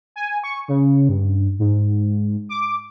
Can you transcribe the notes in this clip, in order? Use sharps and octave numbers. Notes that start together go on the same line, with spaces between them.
G#5
C#6
C#3
G2
G#2
D6